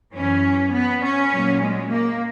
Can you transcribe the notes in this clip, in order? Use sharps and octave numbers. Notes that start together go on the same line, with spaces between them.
F#2 E3 C#4
B3
C#4
A#2 F#3
G#3
A#3